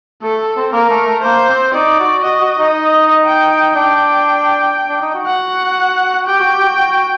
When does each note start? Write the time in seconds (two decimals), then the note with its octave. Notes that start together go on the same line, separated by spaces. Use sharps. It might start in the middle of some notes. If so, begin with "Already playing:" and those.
0.22 A3 A4
0.57 C4
0.73 A#3 A#4
0.90 A3
1.07 A3
1.23 A#3 C5
1.49 C4
1.74 D#4 D5
2.00 F#4
2.24 F#4 D#5
2.41 F#4
2.59 D#4
3.25 G5
3.75 D4 G5
4.89 D4
5.02 D#4
5.14 F#4
5.27 F#5
6.27 G4 G5
6.40 F#4
6.53 G4
6.65 F#4
6.78 F#4